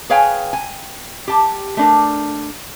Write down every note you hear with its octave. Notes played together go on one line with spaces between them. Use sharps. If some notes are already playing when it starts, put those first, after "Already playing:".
G#4 B4 C#5 F5 G5 G#5
G#5
G4 A5
A3 D4 A#4